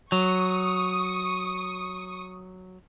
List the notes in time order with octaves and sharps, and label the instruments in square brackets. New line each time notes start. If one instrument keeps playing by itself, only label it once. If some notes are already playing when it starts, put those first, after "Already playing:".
[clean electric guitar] F#3 [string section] C#6 D#6